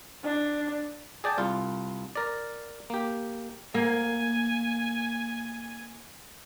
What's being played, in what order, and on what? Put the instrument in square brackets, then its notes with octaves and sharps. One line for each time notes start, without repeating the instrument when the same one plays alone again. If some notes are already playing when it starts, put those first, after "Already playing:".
[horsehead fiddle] D4
[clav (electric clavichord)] G#4 D5 G5 A5
C2 F4
A#4 D5
A#3 G4
[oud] A#3 [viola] G#5